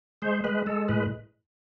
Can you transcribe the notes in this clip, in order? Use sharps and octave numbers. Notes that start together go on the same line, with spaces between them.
G#3 C5
G#3 B4
G#3 A4
A2 B4